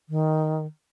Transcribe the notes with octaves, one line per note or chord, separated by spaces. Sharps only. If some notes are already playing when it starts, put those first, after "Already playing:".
D#3